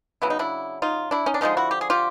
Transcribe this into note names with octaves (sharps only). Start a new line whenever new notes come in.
C#3 F#3 B3 E4
D#4
D4 E4
D#4 F4
D4 E4
C#4 D#4
D4
D3 F3 G#3 C#4 D#4
E4 F#4
G4
G#4
F4 G4